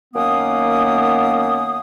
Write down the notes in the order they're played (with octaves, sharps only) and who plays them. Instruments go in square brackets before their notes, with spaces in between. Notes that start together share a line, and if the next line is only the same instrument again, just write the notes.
[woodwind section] F#2 D#3 A#3 B3 D#6